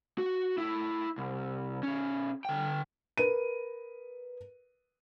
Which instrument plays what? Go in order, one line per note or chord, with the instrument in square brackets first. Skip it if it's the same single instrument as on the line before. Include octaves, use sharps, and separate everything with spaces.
[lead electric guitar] F#4
E4 A4
C2
B2 C#4
D3 G5
[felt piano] A#4 B4 D#7